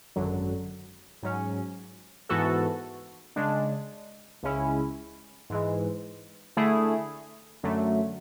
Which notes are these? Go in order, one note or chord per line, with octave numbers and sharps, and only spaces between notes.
G#1 F#2 D3 F#3
G#2 F#3 C#4
G#2 E3 B3 F#4 A4
C#3 G#3 D4
C#2 C#3 G#3 C#4 E4
G#2 E3 G#3
D3 A3 E4 G#4
F#2 D3 F#3 A3